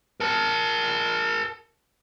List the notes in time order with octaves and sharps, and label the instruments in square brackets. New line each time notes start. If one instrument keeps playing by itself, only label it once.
[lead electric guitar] A#4 A5